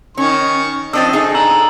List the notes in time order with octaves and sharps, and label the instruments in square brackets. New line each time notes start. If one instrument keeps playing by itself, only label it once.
[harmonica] D#3 C#6 [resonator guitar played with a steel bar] C#4
[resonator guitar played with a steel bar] F3 C4 D4 [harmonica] D#5 [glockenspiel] E6 A6
[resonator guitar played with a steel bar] D#4 G#4 A4
[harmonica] D3 [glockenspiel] A#5 E6 F#7